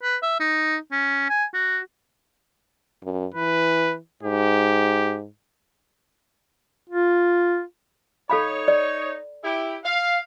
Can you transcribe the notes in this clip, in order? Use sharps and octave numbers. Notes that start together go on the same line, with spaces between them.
B4
E5
D#4
C#4
G#5
F#4
F#2
E3 B4
G#2 G4
F4
D#4 A4 C#5 F5 B5
D5
E4 G4
F5